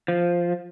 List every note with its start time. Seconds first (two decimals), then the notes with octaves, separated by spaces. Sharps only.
0.08 F3